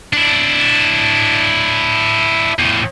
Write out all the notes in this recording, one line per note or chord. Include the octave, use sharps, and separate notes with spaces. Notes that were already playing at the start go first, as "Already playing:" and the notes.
D4 E4
E2 A2